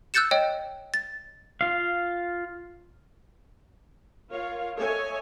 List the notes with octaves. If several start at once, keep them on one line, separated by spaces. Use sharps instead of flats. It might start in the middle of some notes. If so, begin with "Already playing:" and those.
E6 F#6 G6 A6 C#7 E7
C#5 D#5 G5
A6
F4 F5
F4 A#4 C#5 F5
A4 C#5 D#5 E5 G#5